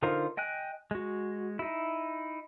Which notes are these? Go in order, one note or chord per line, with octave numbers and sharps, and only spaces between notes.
D3 D#4 F4 A#4 C5
D#5 G5 G#5 F#6
G#3 F#4
D#4 E4